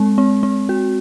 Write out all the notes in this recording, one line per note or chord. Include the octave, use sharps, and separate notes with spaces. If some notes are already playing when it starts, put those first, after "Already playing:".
Already playing: G#3 C4
C4
C4
F#4